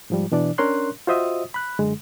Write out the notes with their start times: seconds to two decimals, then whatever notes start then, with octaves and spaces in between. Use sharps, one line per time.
0.10 G#2 F3 G3
0.32 B2 E3 D4 D5
0.58 C#4 D4 A#4 C#5 C6 F#6
1.07 F4 F#4 C5 D#5 E5 D#6
1.54 B5 F#6
1.79 F#2 D3 G#3